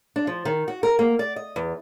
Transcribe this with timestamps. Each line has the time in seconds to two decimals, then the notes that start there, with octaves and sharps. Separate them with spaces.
0.16 D4
0.27 F3
0.45 D#3
0.68 F#4
0.83 A#4
0.99 A#3
1.19 D5
1.36 D#5
1.56 E2